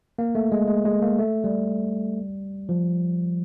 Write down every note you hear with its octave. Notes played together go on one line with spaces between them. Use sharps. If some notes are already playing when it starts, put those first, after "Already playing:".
A#3
A3
G#3
G#3
G#3
A#3
A3
G3
F3